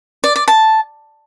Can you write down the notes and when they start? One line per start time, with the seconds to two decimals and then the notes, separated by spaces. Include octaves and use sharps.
0.24 D5
0.36 D5
0.48 A5